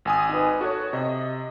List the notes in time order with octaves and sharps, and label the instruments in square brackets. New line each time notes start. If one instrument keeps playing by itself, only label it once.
[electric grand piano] G#1 G#5 D#6
[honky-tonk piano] D#4 B4
[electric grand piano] F#4 [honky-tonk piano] A4 C#5
[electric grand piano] C3 [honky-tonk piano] D#5